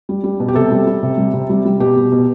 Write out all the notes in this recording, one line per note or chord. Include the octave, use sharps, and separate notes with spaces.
G3
G3
B2
G4
C3 A4
G3
G3
C3
G3
C3
G3
G3
B2 G4
B2
B2